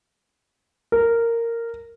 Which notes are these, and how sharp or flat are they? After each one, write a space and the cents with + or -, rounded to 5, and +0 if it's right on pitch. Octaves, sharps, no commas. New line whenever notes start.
A#4 -10